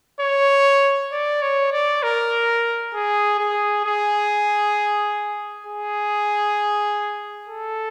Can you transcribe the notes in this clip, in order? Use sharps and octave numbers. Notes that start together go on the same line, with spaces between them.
C#5
D5
C#5
D5
A#4
G#4
G#4
G#4
G#4
A4